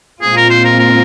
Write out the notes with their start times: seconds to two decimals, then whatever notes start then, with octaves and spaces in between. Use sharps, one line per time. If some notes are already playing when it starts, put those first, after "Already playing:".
0.21 A#2 G#3 C4 F4 G#4
0.36 A#4
0.50 C5
0.64 A#4
0.79 A#4